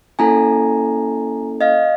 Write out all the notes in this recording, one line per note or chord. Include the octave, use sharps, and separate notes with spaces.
A#3 C#4 E4 A4 G#5 A#5
D#5 F5